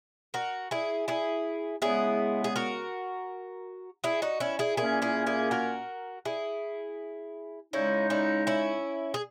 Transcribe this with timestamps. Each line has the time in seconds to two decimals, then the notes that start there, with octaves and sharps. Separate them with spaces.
0.34 F#4 A#4
0.71 E4 G#4
1.08 E4 G#4
1.82 C#3 G#3 B3 E4 G#4
2.44 G#4
2.56 F#4 A#4
4.04 E4 G#4
4.22 D#4 F#4
4.40 C#4 E4
4.59 E4 G#4
4.77 A#2 A#3 C#4 E4 G#4
5.02 E4 G#4
5.27 E4 G#4
5.51 F#4 A#4
6.25 E4 G#4
7.73 C#3 G#3 C#4 D#4 E4
8.10 C#4 E4
8.47 C#4 E4
9.14 G#4